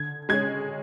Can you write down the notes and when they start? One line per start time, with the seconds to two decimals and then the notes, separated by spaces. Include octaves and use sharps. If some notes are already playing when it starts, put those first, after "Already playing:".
Already playing: D3 G#6
0.29 G#3 C#4 G#6